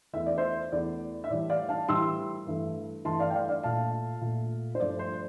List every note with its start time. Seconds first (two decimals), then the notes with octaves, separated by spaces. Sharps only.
0.13 E2 E3 A3 E5
0.26 D5
0.38 C5 E5
0.72 E2 E3 A3 D5
1.24 E5
1.30 A2 E3 G3 D5
1.50 D5 F5
1.69 F5 A5
1.88 A2 E3 G3 C6 E6
2.47 G2 E3 A3
3.05 G2 E3 A3 A5 C6
3.19 D5 F5
3.30 G5
3.34 D5 F5
3.49 D5 F5
3.63 A#2 A3 F5 A5
4.21 A#2 A3
4.75 C5
4.80 G2 F3 A3 D5
4.99 C5